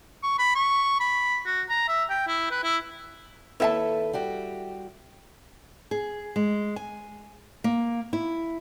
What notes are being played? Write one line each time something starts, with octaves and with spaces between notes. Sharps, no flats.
C#6
B5
C#6
B5
F#4
A#5
E5
G5
E4
B4
E4
D#2 E4 A4 B4 E5 A5
G3 F#4 G4
G#4
G#3
G#5
A#3
E4